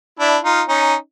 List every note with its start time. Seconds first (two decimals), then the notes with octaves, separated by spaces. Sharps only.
0.19 D4 E4
0.44 D#4 F4
0.68 C#4 D#4